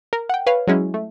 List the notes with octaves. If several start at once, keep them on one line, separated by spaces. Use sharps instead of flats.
A#4
F#5 G5
B4 C#5 F5
F#3 G#3 C#4 E4
A3